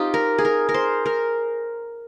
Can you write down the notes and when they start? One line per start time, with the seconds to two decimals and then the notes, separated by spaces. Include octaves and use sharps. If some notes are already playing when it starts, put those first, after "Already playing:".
Already playing: C4 D#4 F4 G4
0.14 A#4
0.38 G#4
0.45 A#4
0.69 A#4
0.74 C5
1.06 A#4